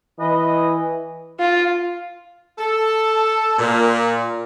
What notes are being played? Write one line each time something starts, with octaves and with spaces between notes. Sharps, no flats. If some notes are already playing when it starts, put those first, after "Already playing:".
E3 B4 D#5
F4
A4
A#2